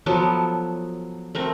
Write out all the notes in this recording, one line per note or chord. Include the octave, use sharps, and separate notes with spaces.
F3 F#3 B3 A4
A3 C4 A#4